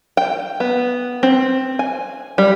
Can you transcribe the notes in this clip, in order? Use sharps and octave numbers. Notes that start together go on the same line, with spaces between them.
G5
B3
C4
G#5
G3